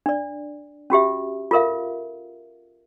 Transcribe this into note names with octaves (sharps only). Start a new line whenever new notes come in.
D4 D5
C#4 F#4 G4 E5
F4 A4 A#4 E5 F5